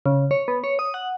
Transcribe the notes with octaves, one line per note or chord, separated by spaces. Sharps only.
C#3
C#5
B3
C#5
D#6
F#5